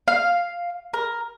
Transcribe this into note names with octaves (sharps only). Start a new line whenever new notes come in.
F5
A#4